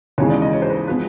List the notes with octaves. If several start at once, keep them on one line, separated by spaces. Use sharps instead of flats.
D#2 C#3 E3 G#3 C#5
D5
D#5
C#5
C5
B4
F3 G#3 B3 B4